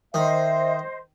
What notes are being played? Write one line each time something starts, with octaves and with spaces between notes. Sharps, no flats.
D#3 C5 D#5 E5